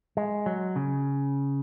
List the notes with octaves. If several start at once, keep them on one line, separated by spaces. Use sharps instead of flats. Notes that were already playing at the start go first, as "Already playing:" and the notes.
G#3
F#3
C#3